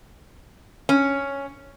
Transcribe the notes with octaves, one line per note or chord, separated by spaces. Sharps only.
C#4